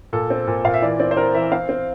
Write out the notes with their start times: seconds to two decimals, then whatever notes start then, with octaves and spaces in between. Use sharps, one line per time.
0.13 A#2 A4
0.30 C4
0.47 A#2
0.65 A#2 F5
0.74 E5
0.82 E3 D5
1.00 C4 D5
1.11 C5
1.17 C4 A#4
1.34 E3 E5
1.52 C4 F5
1.69 C4